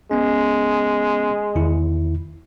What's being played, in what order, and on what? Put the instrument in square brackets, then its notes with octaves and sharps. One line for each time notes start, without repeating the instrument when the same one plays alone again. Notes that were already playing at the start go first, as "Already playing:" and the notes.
[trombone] G#3 [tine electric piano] B3 C#4
[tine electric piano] E2 D#3 E4